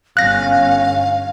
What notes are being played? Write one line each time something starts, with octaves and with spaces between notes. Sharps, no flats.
G1 C#4 F5 F#6 A#6